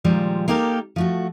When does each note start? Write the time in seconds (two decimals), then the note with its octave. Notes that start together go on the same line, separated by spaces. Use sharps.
0.04 A#2 D#3 F3 G3 G#3
0.48 A#3 D#4 G4 A4 A#4
0.96 F3 A3 F#4